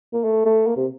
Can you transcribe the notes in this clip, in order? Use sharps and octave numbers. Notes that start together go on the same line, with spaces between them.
A#3
A3
A3
A#3
C3